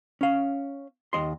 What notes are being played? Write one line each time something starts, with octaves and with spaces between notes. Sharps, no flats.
C#4 F5
D#2 D#5 C6